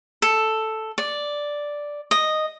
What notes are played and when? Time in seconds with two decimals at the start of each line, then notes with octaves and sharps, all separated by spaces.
0.22 A4
0.98 D5
2.11 D#5